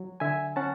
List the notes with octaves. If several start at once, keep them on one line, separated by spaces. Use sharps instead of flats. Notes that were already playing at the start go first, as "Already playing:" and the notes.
Already playing: F#3
D3 E5 G#5
C#4 F#5 A5